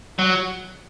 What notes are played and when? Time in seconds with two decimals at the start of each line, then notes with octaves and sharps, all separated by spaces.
0.19 F#3